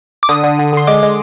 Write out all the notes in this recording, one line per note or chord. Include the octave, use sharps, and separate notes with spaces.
D6
D3 D#6
D3
D3
D3 C6
G#3 D6
G#3